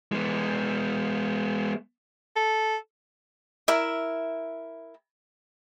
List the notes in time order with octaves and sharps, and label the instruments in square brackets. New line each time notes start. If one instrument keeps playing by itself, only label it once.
[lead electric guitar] G#3 B3
[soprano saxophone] A4
[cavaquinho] E4 A#4 E5